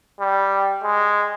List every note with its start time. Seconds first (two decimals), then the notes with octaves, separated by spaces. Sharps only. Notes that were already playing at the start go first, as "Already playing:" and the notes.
0.20 G3
0.83 G#3